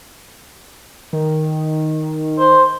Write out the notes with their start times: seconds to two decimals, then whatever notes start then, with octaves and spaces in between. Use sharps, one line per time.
1.13 D#3
2.38 C5